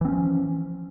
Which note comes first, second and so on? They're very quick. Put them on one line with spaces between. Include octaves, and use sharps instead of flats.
E3 C4 C#4 F3